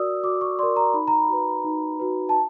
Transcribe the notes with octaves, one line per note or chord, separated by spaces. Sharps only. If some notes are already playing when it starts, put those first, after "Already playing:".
Already playing: F#4 A#4 D5 D#6 E6
F#4 D6
C#6
A#4 D5 C6
A#5
D#4 B5
A#5
B5
F#4 B4
D#4
F#4 B4
A5